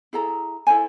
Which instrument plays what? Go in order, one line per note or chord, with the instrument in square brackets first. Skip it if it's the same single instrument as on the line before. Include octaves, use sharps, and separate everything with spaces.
[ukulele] E4 G#4 A4 A#5
E4 A4 C5 G#5